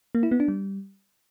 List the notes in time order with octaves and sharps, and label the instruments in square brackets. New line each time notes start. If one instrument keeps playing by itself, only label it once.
[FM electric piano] A#3
E4
B3
D4
G3